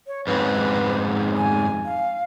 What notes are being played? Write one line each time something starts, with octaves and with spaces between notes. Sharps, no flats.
C#5
F2 G#2 C4 B4
G#5
F5